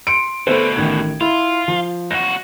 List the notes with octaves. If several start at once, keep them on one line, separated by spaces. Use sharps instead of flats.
C6 C#7 D7
D2 B2 B3 A4 C5
A1 D#3 G#6
E4 F4
F3
C#2 F#4 A#6